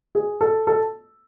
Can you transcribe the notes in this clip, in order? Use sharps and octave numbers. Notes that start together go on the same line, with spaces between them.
G#4
A4
A4